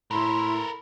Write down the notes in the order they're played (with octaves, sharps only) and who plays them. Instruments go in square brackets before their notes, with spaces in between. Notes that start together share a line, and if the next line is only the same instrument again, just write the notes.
[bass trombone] A2 [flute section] E4 C6 [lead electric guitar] A4 A#4 [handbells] B5